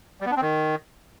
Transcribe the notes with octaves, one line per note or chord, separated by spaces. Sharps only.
G3
B3
D4
C4
D#3